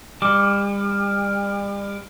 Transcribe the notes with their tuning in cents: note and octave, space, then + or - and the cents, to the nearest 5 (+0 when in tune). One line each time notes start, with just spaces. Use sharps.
G3 +40 D6 +0